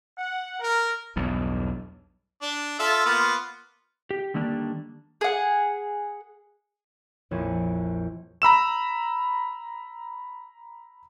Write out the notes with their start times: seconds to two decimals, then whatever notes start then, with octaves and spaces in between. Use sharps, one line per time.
0.18 F#5
0.59 A#4
1.16 B1 E2 G2
2.42 D4
2.79 F4 A4 E5
3.06 A#3 B3 F4
4.11 G4
4.34 D3 D#3 G3 A#3 D4
5.21 G#4 F#5
7.31 A#1 F2 E4 C#5 D#7
8.42 A#5 B5 E6 E7